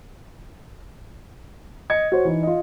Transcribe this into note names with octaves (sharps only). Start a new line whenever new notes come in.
D#5 G#6 C#7
F#4 C5 C#5
E3 D#4
F4 D#5